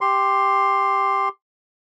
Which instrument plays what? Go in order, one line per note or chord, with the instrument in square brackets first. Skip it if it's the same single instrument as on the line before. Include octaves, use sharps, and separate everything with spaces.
[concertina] G4 C6